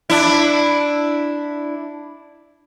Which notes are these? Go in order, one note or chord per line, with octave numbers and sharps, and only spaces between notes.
D4 E4